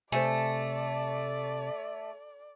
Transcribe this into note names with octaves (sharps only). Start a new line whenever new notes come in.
C3 A3 C5 D5 E5 G#5